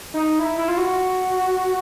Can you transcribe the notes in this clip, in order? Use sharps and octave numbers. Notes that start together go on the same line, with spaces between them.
D#4
E4
E4
F4
F#4